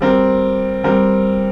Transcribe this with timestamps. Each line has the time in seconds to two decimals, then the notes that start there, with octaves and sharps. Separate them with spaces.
0.01 G3 C4 A#4
0.84 G3 C4 A#4